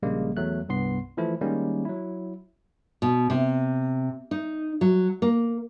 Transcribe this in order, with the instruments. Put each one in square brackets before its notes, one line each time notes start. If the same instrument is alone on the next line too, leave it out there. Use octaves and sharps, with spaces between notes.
[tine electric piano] A#1 C#3 G3 G#3 A#3
E2 F#3 A3 F#6
C2 G2 B3 C6 C7
E3 F3 A3 E4
D#3 G3 G#3 A#3 C#4
F#3 E4
[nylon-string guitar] B2
C3
D#4
F#3
A#3